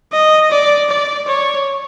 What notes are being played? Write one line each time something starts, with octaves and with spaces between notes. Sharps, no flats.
D#5
D5
D5
C#5